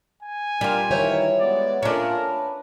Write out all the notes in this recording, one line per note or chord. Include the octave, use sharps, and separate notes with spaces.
G#5
G3 D4 F4 A#4
D#3 E3 A#4 C5 C#5 E5
G#3 B3 D5
A3 A#3 C#4 D4 F4 A#4
B4